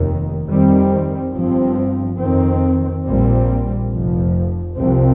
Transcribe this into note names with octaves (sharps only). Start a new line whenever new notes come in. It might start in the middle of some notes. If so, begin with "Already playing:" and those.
Already playing: F1 D#2 D#3
F2 D#3 G3 C4
G1 G2 F3 C4
F2 D#3 C4
A#1 A#2 G3 C4
F1 F2 F3
C2 C3 F3 C4